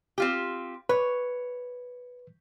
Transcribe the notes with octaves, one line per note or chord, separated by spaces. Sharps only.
C4 F4 G4
B4 C#5